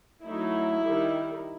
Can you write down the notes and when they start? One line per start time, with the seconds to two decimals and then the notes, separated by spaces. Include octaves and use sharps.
0.24 F#3 A3 D#4 E4
0.85 D#3 G3 D#4